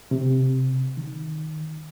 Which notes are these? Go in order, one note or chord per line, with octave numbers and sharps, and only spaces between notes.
C3
D#3